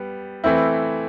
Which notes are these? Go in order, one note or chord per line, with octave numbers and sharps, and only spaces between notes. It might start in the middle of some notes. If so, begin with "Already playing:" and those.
Already playing: G3 B3
E3 A3 C4 E4